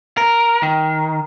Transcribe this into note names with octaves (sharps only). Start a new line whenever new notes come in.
A#4
D#3